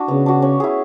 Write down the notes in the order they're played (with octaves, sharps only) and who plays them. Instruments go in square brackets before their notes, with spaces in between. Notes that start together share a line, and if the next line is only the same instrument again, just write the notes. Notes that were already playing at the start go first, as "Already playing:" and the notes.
Already playing: [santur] D4 E4 F#4
[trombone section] C#3 [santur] B3
[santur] D4 F#4
C#4
E4 G#4